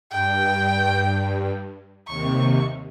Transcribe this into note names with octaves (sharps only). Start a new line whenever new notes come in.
G2 G5
D#2 C3 C#6